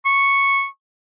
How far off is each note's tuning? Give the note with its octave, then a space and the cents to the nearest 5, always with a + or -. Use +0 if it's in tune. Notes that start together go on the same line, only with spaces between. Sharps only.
C#6 -5